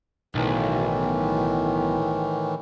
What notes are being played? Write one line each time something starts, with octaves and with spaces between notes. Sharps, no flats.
B1 A2 D#3 E3